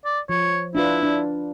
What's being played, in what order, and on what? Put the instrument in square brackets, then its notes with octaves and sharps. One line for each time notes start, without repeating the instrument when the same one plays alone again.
[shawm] D5
[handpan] F3 [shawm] C#5
[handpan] D4 F4 B4 [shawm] E4
[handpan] D4